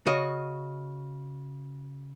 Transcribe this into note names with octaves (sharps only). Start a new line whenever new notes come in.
C#3 F#4 D#5